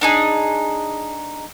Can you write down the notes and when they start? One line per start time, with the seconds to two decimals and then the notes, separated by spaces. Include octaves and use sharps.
0.01 D4 D#4 G#4